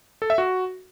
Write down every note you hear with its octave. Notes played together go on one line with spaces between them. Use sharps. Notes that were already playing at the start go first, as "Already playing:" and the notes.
A4
E5
F#4